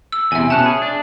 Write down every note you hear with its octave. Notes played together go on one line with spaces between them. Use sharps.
E6
E2 C3 E5 G#5
B2 C#4 A5 F#6
G#4
D4